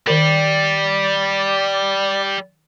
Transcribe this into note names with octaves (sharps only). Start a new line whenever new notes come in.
D#3 G3 A#4 D5